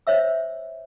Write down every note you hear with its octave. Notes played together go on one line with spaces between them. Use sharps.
C5 C#5 E5 E6